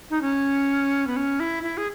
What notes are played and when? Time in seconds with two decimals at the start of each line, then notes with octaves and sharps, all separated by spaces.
0.10 D#4
0.22 C#4
1.07 B3
1.16 C#4
1.40 E4
1.63 E4
1.77 G#4